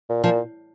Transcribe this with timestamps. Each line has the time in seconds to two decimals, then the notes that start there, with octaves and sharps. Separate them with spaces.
0.09 A#2
0.24 A#2 F3